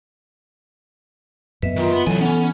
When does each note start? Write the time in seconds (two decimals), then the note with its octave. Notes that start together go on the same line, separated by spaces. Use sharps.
1.63 F#2 B3 B4 D#5 E5
1.76 D#3 F4
1.93 B3
2.07 C2 E3 F#3 A4 G#5
2.21 B3 C#4